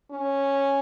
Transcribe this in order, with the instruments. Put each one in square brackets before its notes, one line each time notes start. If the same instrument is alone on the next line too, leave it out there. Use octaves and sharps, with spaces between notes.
[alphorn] C#4